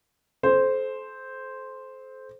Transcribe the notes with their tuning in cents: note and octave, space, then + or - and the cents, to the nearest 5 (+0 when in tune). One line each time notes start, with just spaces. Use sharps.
A4 -35 C5 +0